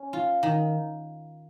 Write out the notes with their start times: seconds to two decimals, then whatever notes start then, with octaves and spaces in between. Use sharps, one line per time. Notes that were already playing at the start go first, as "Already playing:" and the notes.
Already playing: C#4
0.13 F4
0.43 D#3